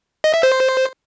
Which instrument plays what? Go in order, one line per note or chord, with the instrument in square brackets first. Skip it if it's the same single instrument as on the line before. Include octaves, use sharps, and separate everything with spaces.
[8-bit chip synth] D#5
E5
C5